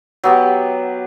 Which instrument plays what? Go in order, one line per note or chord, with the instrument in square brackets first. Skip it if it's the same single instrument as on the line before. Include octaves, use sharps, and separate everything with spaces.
[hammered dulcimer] F#3 B3 G4